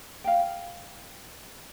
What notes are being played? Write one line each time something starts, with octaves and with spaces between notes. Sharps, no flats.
F5 G5